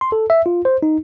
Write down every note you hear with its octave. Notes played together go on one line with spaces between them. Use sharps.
C6
A4
E5
F4
C5
D#4